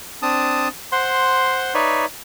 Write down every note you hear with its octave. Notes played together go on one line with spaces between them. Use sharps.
C4 D4 A5 D#6
C5 F#5 C6
D#4 B4 C#5 D5 E5